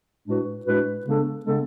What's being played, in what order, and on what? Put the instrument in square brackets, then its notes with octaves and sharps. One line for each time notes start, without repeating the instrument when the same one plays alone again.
[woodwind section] A2 G#3 D4 F#4 B4
A2 G#3 D4 F#4 B4
C#3 G#3 B3 D4 A4
C#3 G#3 B3 D4 A4